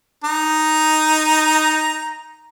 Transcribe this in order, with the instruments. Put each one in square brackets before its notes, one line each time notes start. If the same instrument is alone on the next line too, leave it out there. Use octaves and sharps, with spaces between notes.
[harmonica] D#4 A#5